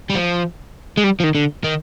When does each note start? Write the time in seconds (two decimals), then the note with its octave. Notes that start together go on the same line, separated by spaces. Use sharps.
0.10 G3
0.15 F3
0.97 G#3
1.04 G3
1.20 F3
1.24 D#3
1.35 D3
1.64 D#3